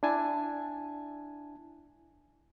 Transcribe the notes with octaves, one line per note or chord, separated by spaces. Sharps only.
D4 E4 G#5 A5